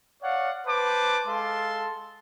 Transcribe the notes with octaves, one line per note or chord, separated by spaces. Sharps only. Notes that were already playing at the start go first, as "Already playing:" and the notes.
C#5 D5 F5 F#5
B4 C5 A5 D6
G#3 A4 F5 A5 C6